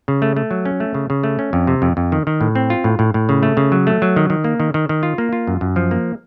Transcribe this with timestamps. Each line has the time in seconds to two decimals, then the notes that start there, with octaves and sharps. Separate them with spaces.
0.08 C#3
0.22 A3
0.36 A3
0.51 F#3
0.65 C#4
0.80 A3
0.94 C#3
1.10 C#3
1.24 A3
1.39 C#4
1.53 F2
1.67 C3
1.82 F2
1.97 F2
2.12 D#3
2.27 D#3
2.41 A2
2.55 C4
2.70 F4
2.84 A2
2.99 A2
3.14 A2
3.29 C#3
3.43 A3
3.57 C#3
3.72 F#3
3.87 A3
4.02 F#3
4.16 D#3
4.30 D#3
4.44 A#3
4.60 D#3
4.74 D#3
4.89 D#3
5.03 F4
5.18 A#3
5.33 F4
5.48 F#2
5.61 F#2
5.76 F3
5.91 A#3